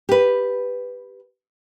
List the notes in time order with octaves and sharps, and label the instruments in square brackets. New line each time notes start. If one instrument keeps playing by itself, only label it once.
[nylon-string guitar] G4 B4